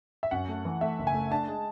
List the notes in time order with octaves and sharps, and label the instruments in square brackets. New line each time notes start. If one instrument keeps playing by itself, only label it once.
[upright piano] E5
[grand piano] F#2 [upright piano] F#5
[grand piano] A3
E3
[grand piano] A3 [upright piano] E5
[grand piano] F#1
[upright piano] G#5
[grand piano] A3
[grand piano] D4 [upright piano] A5
[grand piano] G#3